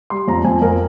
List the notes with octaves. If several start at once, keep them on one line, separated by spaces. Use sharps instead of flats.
G3 C6
F2 A#5
F2 G#5
F2 A#4